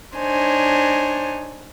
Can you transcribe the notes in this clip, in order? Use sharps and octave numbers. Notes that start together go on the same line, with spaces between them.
D4 D#4 C5 C#5 G#5